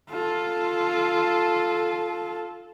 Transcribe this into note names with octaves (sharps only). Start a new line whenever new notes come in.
F4 A4